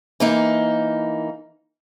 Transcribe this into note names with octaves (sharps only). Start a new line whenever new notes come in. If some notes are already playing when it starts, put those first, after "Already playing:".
E3 A#3 D#4